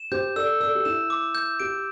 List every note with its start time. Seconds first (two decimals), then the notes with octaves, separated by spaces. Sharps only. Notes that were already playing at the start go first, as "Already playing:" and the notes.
Already playing: E7
0.12 G4 C5 G6
0.36 A4 D5 E6
0.60 A4 D5 E6
0.75 G4
0.85 E4 E7
1.10 D6
1.35 G6
1.60 G4 D7